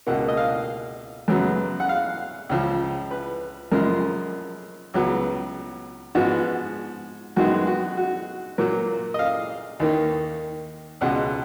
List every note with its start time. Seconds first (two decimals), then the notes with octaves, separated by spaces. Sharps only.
0.07 C#2 B2 A#3 F#5
0.28 D#5
0.37 F5
1.28 F#2 C#3 F#3 B3
1.80 F#5
1.89 F5
2.49 C#2 C#3 F3
3.11 B4
3.72 F#2 C#3 F3 G#3 A#4
4.94 C#2 C#3 F#3 B3
6.15 G#2 F3 B3 F#4
7.36 F#2 D#3 G#3 B3 F#4
7.67 F#4
7.97 F#4
8.58 A#2 F#3 A#3
9.14 D#5
9.19 F5
9.80 D#2 D#3 A#3
11.01 C#2 B2 G#3 F#5